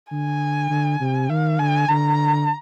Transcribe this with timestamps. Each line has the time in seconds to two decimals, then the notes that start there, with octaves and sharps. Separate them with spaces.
0.12 D3 G#5
0.70 D3
1.01 C3
1.30 D#3 F5
1.59 D3 G#5
1.89 D3 A#5